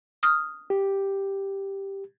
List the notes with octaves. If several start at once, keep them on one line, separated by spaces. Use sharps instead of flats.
D#6 F6
G4